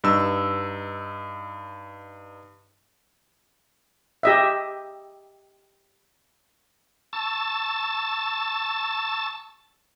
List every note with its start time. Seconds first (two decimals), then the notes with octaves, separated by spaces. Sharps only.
0.04 G2 D#4 E6
4.23 G4 D#5 E5
7.13 A5 C#6 E6 A6